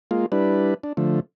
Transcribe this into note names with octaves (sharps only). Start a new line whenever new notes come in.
G#3 A#3 F4
G3 D4 E4 B4
D4
D3 F3 A3